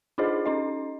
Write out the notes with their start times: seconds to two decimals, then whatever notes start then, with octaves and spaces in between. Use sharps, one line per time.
0.18 D4 D#4 F4 G#4 C5 D#5
0.46 C#4 D#4 D#5